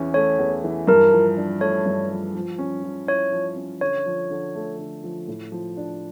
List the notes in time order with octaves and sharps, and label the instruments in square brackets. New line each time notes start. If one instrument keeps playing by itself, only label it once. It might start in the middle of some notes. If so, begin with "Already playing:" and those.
Already playing: [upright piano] E2 E3 C#4
[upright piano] A3 [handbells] C#5
[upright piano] E2
E3
[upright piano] G2 [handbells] A#4
[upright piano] F3
D4
[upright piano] A3 [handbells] C#5
[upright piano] G2
F3
F3
C#4
F3
[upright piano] E4 [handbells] C#5
[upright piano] F3
C#4
[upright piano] D3 [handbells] C#5
[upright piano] F3
D3
A3
D3
F3
A2
F3
D4